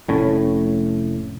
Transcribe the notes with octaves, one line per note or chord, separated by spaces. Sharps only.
F1 A2 C#4